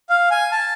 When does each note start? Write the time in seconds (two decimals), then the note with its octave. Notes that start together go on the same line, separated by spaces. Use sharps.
0.09 F5
0.31 G#5
0.52 A5